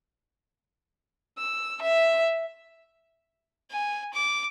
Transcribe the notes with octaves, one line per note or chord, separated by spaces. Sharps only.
E6
E5
G#5
D6